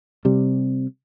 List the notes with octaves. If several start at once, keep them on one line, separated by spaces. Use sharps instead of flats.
C3 G3